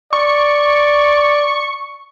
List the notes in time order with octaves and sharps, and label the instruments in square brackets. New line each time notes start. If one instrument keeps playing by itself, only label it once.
[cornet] D5 [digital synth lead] C#6